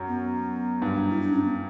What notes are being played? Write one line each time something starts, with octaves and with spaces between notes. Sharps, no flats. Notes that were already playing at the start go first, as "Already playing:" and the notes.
Already playing: F#2
B3
G2
E4
D4
C#4
B3